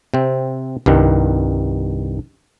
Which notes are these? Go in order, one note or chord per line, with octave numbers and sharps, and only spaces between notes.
C3 C4
C2 G2 D#3